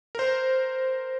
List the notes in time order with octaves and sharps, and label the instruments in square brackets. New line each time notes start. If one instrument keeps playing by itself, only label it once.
[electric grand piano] A#4 C5